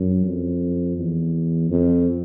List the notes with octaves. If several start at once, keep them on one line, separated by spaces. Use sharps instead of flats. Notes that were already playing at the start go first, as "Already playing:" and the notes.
Already playing: F#2
F2
E2
F2